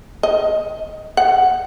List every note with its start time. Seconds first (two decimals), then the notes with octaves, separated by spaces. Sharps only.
0.23 D#5
1.17 F#5